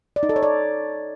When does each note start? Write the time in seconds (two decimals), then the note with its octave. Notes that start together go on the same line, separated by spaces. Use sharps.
0.16 D5
0.23 D#4
0.29 A4
0.36 C#5
0.43 D5